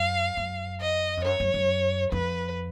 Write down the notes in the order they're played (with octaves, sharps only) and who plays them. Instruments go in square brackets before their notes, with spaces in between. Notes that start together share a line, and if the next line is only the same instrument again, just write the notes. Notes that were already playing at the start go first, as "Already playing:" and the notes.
Already playing: [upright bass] F#2 [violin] F5
[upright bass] F#2
[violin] D#5
[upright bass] F2
[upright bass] F#2 [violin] C#5
[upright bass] F#2
F#2
[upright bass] F2 [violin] B4